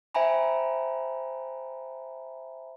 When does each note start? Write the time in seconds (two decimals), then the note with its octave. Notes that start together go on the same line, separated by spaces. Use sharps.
0.14 C5 E5 G5 G#5 A#5 B5